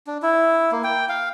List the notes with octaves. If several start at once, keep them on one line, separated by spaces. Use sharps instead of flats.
D4
E4
A#3
G5
F5